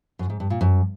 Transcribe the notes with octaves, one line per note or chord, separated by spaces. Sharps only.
F#2
G#2
G2
A#2
F#2